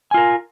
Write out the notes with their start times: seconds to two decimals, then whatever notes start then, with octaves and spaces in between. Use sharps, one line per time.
0.11 G#5
0.14 F4
0.17 A#4